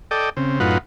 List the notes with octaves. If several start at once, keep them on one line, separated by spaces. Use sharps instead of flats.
A4 D5 D#5 G5
C#3 C4
F#2 A2 D#4 F4 B4 F#5